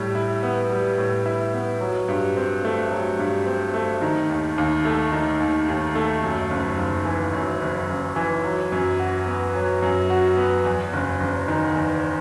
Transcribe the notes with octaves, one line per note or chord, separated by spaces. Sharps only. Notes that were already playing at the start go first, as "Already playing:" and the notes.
Already playing: A2 G3
E4
B3
G3
A2
E4
B3
F#3
G2
C4
A3
F#3
G2
C4
A3
D#3
D#2
D#2
A3
D#3
D#2
D#2
A3
F#2
F#1
F#1
E3
F#2
F#1
F#1
E3
F#3
F#2
F#4
B3
F#3
F#2
F#4
B3
E2
F#1
F#1
D#3
E2